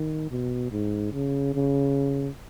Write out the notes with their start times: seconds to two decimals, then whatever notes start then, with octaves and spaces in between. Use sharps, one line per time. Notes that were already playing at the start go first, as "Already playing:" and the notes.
Already playing: D#3
0.31 B2
0.71 G#2
1.12 C#3
1.54 C#3